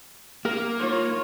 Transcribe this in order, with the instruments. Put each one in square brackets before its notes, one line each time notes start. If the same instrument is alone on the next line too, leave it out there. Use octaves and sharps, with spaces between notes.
[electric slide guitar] A#3 [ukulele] A#4
[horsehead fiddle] F4 C#5